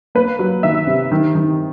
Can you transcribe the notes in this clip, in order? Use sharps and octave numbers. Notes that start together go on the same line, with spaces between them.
A#3 B4
F#3
D#3 E5
C3
D#3
D#3